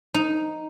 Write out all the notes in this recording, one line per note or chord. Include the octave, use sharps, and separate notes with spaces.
D#4